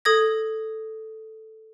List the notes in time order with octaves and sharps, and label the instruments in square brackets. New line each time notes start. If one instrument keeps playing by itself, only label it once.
[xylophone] A4 D#6 G#6 A#6